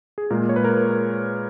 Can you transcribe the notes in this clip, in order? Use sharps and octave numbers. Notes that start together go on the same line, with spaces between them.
G#4
A#2 G#3 A#4
C#5
B4
A#4
B4